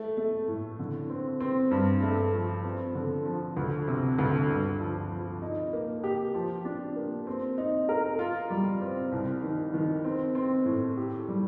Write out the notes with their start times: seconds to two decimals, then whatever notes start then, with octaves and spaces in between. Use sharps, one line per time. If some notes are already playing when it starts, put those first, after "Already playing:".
Already playing: A3
0.17 A3
0.48 A2
0.79 D3
1.10 C4
1.40 C4
1.71 G2
2.03 A3
2.34 F3
2.64 C4
2.95 D3
3.25 F3
3.57 D2
3.88 C3
4.19 D2
4.49 G2
4.80 F3
5.11 F3
5.42 D#4
5.73 A#3
6.04 G4
6.34 F3
6.65 D4
6.96 A#3
7.27 C4
7.58 D#4
7.89 A#4
8.19 F4
8.50 G3
8.81 C4
9.12 C2
9.43 D#3
9.74 D#3
10.04 C4
10.35 C4
10.66 A2
10.97 G4
11.28 G3